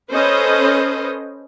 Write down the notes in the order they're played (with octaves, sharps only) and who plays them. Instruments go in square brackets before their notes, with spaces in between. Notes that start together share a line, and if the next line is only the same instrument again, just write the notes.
[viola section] C#4 A4 B4 C5 D#5